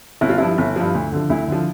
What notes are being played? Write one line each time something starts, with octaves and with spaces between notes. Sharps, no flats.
G1 E4
F4
G2 F3 E4
G1
G2 F3
D2
D3 F3
D2 E4
D3 F3